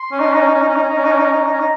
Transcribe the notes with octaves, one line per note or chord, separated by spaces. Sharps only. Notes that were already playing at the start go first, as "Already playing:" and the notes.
Already playing: C6
C#4
D#4
C#4
D#4 A#5
C#4
D#4
C#4
D#4
C#4
D#4
C#4
D#4
C#4
D#4
C#4
D#4
C#4
D#4
C#4
D#4
C#4
D#4